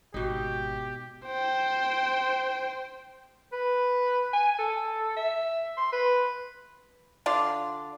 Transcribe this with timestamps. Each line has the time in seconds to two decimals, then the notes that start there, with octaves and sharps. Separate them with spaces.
0.14 G#1 B2 D#4 G4
1.26 C5 G5
3.52 B4
4.33 G#5
4.59 A4
5.17 E5
5.77 C6
5.93 B4
7.26 D3 F4 D5